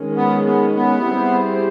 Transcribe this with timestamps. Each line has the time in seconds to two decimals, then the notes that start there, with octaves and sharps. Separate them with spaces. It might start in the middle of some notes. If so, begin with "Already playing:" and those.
Already playing: D#3 G#3 C#4
0.16 B3
0.45 B3
0.75 B3
1.04 G3 C4 E4 G#4 C5